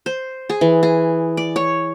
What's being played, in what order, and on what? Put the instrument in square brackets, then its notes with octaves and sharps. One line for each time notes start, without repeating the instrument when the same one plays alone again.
[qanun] C5
G#4
E3
G#4
D5
C#5